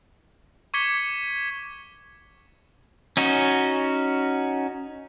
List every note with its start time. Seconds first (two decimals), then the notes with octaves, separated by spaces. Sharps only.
0.74 C#6 D6 G#6 B6 C#7 G7
3.17 C#4 D#4 F#4